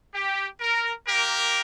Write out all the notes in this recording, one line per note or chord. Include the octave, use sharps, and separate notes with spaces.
G4
A#4
A#3 G4 A#4